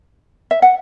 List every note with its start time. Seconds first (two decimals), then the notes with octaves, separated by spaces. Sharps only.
0.51 E5
0.62 F#5